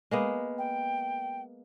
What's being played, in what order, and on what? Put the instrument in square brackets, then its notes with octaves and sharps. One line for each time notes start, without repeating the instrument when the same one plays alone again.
[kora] G#3 A#3 B3
[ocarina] G5